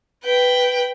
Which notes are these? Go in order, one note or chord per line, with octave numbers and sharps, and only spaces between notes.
B4 G5